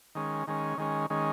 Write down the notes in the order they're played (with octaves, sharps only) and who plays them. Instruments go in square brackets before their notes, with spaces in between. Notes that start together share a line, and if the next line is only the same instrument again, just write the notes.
[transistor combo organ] D#3 G#3 C#4
D#3 G#3 C#4
D#3 G#3 C#4
D#3 G#3 C#4